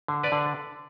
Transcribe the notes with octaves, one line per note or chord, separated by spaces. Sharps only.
D3
B4 D5
D3